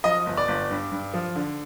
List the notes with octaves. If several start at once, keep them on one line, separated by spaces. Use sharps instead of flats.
F3 D#5
G1
D5
G1
G2
G2
F3
D3